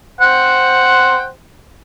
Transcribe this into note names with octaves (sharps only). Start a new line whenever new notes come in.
C5 F#5 G5